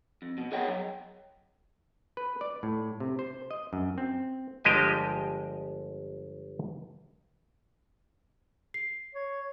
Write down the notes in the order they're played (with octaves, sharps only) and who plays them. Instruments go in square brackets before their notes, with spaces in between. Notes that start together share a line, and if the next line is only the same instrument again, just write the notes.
[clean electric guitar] F2
B2
G#4 A#4 C#5 D#5 F#5 G5
F#3
[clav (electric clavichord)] B4
D5
A2
C3
C5
D#5
F#2
C4
G1 F3 G#3 G4 D#5 G#5
[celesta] C7
[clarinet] C#5